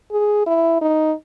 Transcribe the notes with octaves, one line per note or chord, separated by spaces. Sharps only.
G#4
E4
D#4